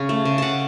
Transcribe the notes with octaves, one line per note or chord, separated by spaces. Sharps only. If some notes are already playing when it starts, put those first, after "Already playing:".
Already playing: C#3 C#4
A3
C#3
C#3 F#5 A5